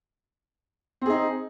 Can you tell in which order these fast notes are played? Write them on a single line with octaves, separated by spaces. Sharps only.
C4 G#4 D#4